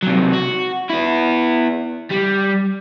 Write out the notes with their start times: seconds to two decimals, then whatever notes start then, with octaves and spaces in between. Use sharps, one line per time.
0.03 C3 F#3
0.33 F#4
0.90 B3 E4
2.10 G3